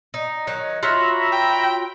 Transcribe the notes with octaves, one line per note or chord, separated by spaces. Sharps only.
D#4
D#3 F#3 D#4
F4 F#4 C#5 E5 A#5 B5
G5